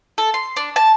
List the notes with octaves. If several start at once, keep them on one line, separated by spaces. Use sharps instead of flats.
A4
C6
D4
A5